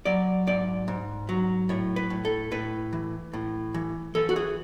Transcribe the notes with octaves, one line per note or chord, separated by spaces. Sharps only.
F#3 D5
G#2 D5
G#2
F#3
A2 C#5
B4
A2
A4
A2 B4
E3
A2
E3
E3 A4
F#4
G#4